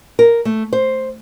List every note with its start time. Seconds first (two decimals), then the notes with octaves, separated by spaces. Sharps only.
0.19 A#4
0.45 A3
0.73 C5